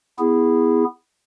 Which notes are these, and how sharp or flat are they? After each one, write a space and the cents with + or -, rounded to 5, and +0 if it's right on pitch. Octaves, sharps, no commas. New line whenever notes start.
B3 +5 E4 +0 G#4 -15